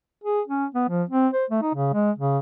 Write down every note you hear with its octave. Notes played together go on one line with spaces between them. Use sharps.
G#4
C#4
B3
F3
C4
C5
A3
D#4
C#3
G#3
C#3